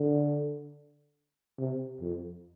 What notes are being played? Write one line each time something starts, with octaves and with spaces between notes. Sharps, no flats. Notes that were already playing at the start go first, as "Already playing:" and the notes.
Already playing: D3
C3
F2